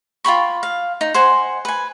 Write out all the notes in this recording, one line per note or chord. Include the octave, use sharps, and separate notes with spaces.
F4 G5 B5 C#6
F5
D#4
C5 F#5 G#5
B4 G#5